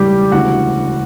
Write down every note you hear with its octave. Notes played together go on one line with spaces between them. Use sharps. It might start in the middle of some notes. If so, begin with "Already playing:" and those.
Already playing: E1 D2 C#3 E3 G3 G4
E1 D2 C#3 E3 F#4 F#5